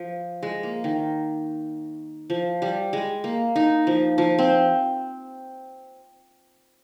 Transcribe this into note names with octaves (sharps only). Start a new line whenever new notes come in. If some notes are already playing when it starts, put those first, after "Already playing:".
Already playing: F3
G#3
A#3
D#3
F3
G3
G#3
A#3
D#4
F3
F3
C4